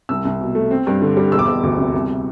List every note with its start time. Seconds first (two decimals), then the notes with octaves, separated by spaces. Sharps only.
0.09 C2 E6
0.25 C2
0.41 B2
0.55 A3
0.71 C4
0.87 G2
1.02 D3
1.17 G3
1.32 E1 E6
1.39 D6
1.46 E1 E6
1.63 D2
1.78 C3
1.93 C2